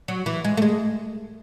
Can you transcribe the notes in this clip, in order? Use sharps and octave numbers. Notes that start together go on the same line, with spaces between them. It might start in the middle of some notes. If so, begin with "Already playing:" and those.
F#3
E3
G#3
A3
G#3